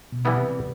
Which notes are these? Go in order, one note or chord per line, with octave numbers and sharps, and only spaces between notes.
B2
E3 G3 B3 E4
C3